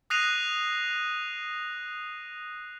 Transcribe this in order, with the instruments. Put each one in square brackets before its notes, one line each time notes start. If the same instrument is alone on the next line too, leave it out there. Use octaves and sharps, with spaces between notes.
[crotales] D#6 F#6 A#6 C7 D#7 F7